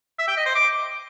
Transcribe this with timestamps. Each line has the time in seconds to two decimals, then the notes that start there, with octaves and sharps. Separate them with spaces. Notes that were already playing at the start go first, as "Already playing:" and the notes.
0.19 E5
0.28 G5
0.37 D#5
0.46 C5
0.55 D6